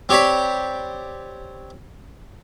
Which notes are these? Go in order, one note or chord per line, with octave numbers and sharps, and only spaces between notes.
C4 G4 C#5 D5 B5